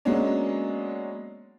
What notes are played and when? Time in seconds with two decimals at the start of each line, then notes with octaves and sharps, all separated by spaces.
0.05 F#3 G#3 A#3 B3 C#4 D4